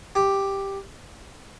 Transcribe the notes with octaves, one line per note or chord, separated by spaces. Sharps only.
G4